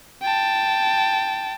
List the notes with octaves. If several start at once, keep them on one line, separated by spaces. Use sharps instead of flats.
G5 A5